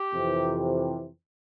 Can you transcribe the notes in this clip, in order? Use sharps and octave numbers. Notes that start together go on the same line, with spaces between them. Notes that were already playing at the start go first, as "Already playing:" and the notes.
Already playing: G4
F2 C3 E3